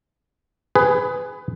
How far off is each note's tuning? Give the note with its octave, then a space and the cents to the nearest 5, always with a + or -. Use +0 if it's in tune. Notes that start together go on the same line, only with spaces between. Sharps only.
G#4 +0 B4 +20